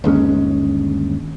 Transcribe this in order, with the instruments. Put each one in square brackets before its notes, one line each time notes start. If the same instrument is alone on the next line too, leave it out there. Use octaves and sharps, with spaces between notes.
[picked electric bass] G1 D#2 G#3 C#4